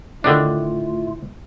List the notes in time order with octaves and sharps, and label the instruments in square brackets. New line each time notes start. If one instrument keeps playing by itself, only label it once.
[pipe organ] A2 A3 F4 [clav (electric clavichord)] D3 D#3 D4